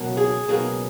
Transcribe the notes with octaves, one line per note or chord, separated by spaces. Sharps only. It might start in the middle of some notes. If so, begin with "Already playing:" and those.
Already playing: C#2 B2 F#3 A#3
G#4
C#2 B2 F#3 A#3 G#4